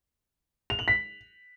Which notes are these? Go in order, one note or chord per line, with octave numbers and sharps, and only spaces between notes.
F7
F#7
B6